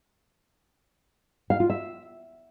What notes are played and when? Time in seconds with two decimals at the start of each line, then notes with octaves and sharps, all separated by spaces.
1.50 F5
1.60 F4
1.70 E5